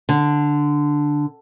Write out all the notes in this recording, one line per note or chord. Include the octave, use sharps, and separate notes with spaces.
D3